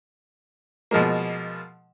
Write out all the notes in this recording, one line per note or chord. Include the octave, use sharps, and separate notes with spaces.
B2 F3 G#3 A#3